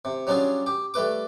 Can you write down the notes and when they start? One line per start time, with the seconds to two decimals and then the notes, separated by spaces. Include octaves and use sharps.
0.05 C3
0.27 F#3 G3 C#4 D4 F4 G#4
0.66 G4
0.94 G3 A3 B4 D6